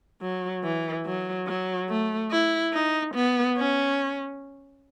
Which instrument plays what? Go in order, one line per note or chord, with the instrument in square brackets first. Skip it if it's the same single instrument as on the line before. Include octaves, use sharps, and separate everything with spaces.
[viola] F#3
E3
F#3
F#3
A3
E4
D#4
B3
C#4